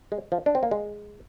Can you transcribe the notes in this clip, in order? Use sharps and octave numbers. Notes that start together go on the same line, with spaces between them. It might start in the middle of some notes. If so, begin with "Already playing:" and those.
G#3
F3
D4
C4
A#3
G#3